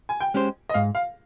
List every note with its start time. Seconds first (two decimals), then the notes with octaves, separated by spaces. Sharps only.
0.09 G#5
0.20 G5
0.34 G#3 C#4 G4 C5
0.69 D#5
0.74 G#2 F5
0.95 F5